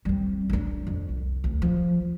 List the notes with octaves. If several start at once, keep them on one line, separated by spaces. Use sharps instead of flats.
G3 C4
D4 D#4
F2
C2
D2
F3